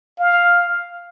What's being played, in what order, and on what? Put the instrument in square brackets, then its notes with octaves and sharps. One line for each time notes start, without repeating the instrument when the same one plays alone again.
[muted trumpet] F5